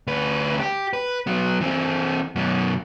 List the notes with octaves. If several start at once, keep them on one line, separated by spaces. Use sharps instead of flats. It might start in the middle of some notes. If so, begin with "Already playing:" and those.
D2 B4
G4
B4
F#3 B3
E3 C4
F#2 B2